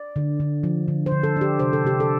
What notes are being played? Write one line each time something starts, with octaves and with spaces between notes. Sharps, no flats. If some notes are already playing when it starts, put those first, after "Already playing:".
Already playing: D5
D3
D3
F3
D3
C5
D3
A4
D4 G4
C3 C5
A4
C3 G4
A4